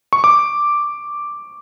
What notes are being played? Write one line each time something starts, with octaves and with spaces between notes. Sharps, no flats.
C#6
D6